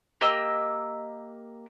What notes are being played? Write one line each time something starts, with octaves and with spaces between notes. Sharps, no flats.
A#3 G4 D#5 E6